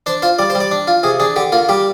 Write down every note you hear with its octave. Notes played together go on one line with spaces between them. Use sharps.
D4 C5
F4 C5
G3 D5
C5
G3
D5
D4
F4
C3 G#4
D4 G#4
D3 G4
A#3 F4
G3 G4